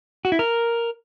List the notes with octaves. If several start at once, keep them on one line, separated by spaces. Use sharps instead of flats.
F#4
E4
A#4